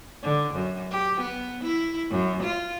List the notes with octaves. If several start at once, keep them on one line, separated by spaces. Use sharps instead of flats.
D3
F#2
G4
B3
E4
F#2
F4